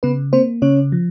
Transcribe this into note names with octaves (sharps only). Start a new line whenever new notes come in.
C#3 B3 B4
A#3 C4 C5
C#3 C#4 C#5
F3